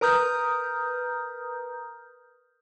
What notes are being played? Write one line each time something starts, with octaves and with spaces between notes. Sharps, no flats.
A#4 B4 A#5 D#6 F6 G6